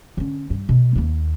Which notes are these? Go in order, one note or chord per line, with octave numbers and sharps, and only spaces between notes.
D3 C#4
G2
B2
D#2 A#3